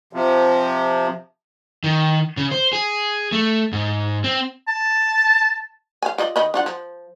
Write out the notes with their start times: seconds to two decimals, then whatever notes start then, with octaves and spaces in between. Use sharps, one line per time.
0.13 C3 F3
1.84 D#3
2.37 C#3
2.52 C5
2.73 G#4
3.32 A3
3.73 G#2
4.24 C4
4.68 A5
6.02 F5 G#5
6.18 F4 D5 D#5
6.36 D#3 D#5 B5
6.54 D4 F4 F#5
6.66 F3